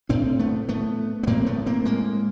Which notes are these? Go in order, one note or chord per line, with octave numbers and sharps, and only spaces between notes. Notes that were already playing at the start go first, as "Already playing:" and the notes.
A2 C4 D4
A3 B3
A3 B3
B3
A2 A#3 C4
A3 B3
A#3 C4
G#3 A#3